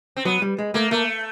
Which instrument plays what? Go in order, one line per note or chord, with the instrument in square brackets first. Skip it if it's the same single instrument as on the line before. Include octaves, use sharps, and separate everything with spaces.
[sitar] C4
[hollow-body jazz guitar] F#3 [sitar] B3
[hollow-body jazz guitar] G3
G#3
[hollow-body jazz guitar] A3 [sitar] A#3
[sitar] A3 [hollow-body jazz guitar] A#3